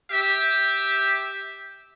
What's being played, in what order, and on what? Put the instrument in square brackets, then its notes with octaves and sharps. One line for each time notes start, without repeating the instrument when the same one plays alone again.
[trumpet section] G4 E5